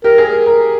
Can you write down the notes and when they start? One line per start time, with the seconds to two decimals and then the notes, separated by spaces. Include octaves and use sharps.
0.04 G4 A#4
0.18 G#4
0.46 A#4